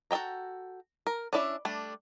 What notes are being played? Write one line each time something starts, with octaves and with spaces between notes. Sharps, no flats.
F#4 A4 E5 G5 A#5
A#4
C#4 D4 E4 D5 E5
G3 A3 D4